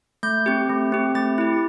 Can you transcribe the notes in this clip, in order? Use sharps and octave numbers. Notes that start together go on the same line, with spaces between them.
A3 G6
C4 G4
A3
C4 G4
A3 A6
E4 G4